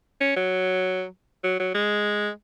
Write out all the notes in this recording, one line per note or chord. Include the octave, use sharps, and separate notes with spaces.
C#4
F#3
F#3
F#3
G#3